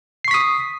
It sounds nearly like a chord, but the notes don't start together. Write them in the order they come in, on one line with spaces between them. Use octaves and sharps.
C7 C#6 B6 D#6